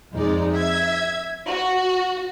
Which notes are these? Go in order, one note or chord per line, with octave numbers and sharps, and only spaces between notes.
F2 G#3 D#4 D5
E5 G#6
F#4